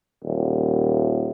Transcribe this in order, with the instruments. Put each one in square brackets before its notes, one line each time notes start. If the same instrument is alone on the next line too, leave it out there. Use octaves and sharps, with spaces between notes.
[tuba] D#1